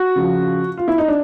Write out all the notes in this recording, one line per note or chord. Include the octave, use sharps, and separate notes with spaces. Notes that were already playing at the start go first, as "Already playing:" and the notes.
Already playing: F#4
C#3 F3
F4
E4
D#4
D4